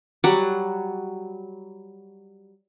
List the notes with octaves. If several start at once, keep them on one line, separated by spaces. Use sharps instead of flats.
F#3 G3 F#5 D6